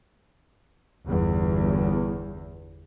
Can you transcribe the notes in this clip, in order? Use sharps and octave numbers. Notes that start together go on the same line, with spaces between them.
G1 E2